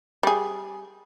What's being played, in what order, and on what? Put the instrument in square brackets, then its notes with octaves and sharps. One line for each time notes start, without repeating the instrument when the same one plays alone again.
[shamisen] G3 G#4